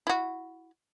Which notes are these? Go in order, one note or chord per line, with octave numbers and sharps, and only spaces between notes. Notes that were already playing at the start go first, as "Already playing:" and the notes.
E4 F#4